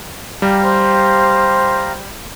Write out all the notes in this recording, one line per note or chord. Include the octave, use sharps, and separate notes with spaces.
G3 G4 F5 A#5
C5